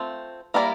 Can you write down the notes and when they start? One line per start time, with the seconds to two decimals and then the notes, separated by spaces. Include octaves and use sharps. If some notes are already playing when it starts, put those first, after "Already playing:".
Already playing: A3 C4 F4
0.54 G3 A#3 E4 A#4 D5